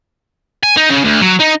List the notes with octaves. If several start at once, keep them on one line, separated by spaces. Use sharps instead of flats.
G#5
D#4
C#3
D2
F#3
D#4